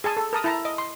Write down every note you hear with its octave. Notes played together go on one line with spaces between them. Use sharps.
G#4 G#5 A5
A4
A#4 A5 D#6
E4 A5 A#5
D#5
C6